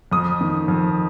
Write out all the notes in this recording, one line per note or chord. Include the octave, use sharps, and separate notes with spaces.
F2 D#6
D#3
F2